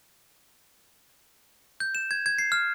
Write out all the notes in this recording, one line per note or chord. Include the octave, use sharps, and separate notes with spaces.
G6
E7
G#6
G#6
C7
F6